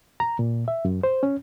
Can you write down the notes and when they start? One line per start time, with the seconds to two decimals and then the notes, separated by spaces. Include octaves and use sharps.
0.20 A#5
0.39 A#2
0.68 E5
0.85 F#2
1.03 C5
1.23 C#4